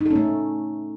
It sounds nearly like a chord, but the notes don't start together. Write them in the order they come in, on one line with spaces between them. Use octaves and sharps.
D#4 A4 C#4 A3